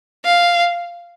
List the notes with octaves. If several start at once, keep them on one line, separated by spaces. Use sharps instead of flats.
F5